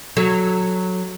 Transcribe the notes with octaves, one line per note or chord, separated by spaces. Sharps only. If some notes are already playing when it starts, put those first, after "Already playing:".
F#3 A4